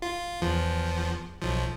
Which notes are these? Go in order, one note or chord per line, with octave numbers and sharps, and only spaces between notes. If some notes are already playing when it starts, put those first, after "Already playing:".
F4
E2 F3
B1 F3